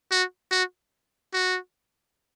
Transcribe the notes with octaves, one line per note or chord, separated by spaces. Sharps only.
F#4
F#4
F#4